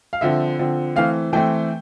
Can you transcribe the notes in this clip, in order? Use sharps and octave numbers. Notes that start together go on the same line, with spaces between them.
F5
D3 F3 C4 E5
D3 F3 C4
E3 A3 C4 F5
E3 A3 C4 G5